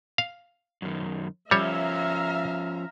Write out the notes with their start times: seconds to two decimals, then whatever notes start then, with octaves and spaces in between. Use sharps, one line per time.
0.18 F5
0.82 F#2 D#3
1.51 F3 G3 C#4 C#5 E5 F5 A#5